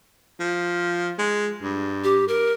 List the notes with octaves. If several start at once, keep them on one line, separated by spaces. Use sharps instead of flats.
F3
G#3
G2
G4
A#4